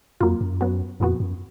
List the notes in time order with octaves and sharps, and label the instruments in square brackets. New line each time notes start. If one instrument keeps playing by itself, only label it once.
[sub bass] F2 [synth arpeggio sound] F#3 A#3 F4
[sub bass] F#2
[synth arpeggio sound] F#3 B3 F#4
[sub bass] F2 [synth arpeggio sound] A#2 F3 B3 F#4
[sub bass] F#2